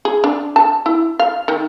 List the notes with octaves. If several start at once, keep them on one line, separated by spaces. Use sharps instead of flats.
G#4
D4
A5
E4
F5
D#3